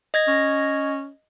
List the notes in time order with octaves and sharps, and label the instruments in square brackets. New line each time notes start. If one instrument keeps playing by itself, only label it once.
[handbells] D#5 G#6 A#6
[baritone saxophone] C#4